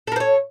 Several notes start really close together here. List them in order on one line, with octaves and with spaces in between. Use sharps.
A4 A#4 C5 C#5